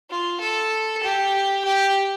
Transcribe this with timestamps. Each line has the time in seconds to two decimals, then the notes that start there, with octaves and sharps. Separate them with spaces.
0.10 F4
0.40 A4
1.03 G4
1.65 G4